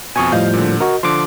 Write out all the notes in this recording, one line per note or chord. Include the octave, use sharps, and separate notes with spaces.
F2 B2 G#5 C#6 D#6
A2 F3 G3 D#5 F5 G6
A#2 D3
F#4 A#4 D#5
D3 F3 C6 D6